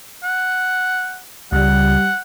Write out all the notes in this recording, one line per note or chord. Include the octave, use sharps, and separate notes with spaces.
F#5
C#2 G3 F#5